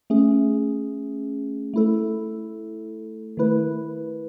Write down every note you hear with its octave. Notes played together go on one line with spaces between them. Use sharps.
A3 C#4 G#4
A3 E4 A4
D#3 A3 E4 B4